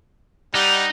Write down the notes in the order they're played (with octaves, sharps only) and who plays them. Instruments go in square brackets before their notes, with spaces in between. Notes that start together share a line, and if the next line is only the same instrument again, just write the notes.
[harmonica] G3 F#5 [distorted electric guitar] D#4